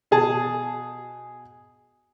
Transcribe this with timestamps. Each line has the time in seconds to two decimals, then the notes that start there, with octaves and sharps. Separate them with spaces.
0.11 B2 G#4 A5